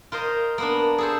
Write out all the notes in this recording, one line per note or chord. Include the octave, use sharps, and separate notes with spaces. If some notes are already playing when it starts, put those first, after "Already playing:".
F4 A#4 C5 D#5
A#3 B3 D4
G#4 A4 C5